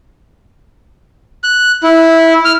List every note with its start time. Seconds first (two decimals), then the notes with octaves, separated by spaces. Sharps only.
1.44 F#6
1.83 E4
2.45 F6